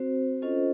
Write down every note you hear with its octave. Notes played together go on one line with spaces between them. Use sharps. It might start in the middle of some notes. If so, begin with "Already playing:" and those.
Already playing: C4 F#4 C5
C#4 F4 A4 C5 D#5